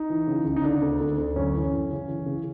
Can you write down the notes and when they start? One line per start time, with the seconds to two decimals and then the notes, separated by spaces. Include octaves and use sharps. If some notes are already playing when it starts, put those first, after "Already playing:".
Already playing: D#4
0.10 E3
0.27 C#3
0.45 C#2
0.56 D#4
0.64 D3 D4
0.82 D2
1.00 D2
1.18 D2
1.36 F#2 C#4
1.54 E3
1.72 F#2
1.90 C#3
2.08 E3
2.26 C#3